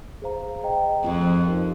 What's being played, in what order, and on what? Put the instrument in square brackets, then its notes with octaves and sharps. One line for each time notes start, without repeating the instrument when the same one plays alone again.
[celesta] G#4 C5 F5 A#5
G#4 D#5 G5 A#5
[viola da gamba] F2 [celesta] F4 G#4 C5 D#5
[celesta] D#4 G4 A#4 F5